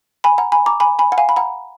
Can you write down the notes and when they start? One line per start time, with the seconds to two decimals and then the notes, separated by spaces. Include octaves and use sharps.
0.24 G#5 B5
0.38 F#5 A#5
0.52 G#5 B5
0.66 A#5 D6
0.80 G#5 B5
0.99 G#5 B5
1.12 F#5
1.18 F5 G#5
1.29 B5
1.36 F#5 A#5